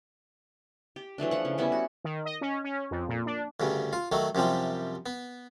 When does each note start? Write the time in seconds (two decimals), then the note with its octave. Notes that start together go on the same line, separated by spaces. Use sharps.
0.96 G4
1.18 E3 F#3 A3 D4
1.31 F3 F#5
1.45 C#3
1.58 G3 B3 C#4 E4
1.72 F#4
2.04 D#3
2.25 D#5
2.41 C#4
2.64 C#4
2.91 F2
3.09 A#2
3.26 D4
3.60 D2 G2 C#3
3.93 F4
4.12 D#3 F#3 A3
4.35 F#2 C3 F3 G3
5.06 B3